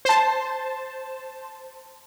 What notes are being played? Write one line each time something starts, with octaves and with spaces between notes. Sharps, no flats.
C5 A5